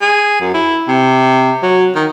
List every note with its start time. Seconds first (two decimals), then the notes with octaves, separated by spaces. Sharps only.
0.01 G#4
0.41 F#2
0.54 E4
0.88 C3
1.63 F#3
1.95 D#3